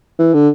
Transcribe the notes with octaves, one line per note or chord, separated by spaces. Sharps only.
E3
D3